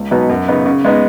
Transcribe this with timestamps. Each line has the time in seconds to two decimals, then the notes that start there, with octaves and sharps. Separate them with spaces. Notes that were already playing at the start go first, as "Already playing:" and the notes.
Already playing: C#2
0.11 B2 F#3 B3 D#4
0.30 F#2
0.48 C#3 B3 D#4
0.66 C#3
0.85 G#3 B3 D#4